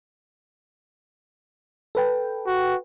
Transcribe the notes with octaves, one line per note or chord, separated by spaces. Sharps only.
A4 B4 G5
F#4